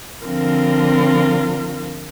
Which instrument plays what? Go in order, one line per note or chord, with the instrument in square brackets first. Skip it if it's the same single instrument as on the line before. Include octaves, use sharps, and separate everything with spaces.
[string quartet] D3 F3 C4 F4 A#4